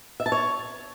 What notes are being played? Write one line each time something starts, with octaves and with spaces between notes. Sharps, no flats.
E5
A5
C#5